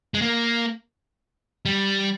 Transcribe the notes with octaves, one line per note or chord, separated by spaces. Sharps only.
G#3
A#3
G3